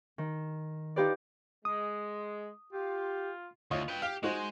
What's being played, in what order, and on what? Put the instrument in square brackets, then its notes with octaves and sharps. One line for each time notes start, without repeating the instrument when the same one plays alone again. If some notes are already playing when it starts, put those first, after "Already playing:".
[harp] D#3
D#4 F4 G4 B4 D5
[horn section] G#3 [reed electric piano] D#6
[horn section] F4 [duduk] G4
[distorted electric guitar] D2 [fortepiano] F4 C#5 D#5
[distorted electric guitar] B4 G5
[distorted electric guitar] G4 [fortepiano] F5
[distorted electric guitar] G#3 [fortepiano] D#4 F#4 C5